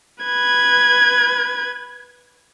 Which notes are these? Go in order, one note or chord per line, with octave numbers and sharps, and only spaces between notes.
B4 G#6